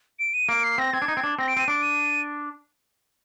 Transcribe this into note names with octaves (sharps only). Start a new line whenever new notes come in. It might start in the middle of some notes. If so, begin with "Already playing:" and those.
D7
D#7
A#3 D7
C7
C4 A#6
C4 G#6
D4
D#4
C4
D4
C4 A#6
D7
C4 D#7
D4 D7
D#7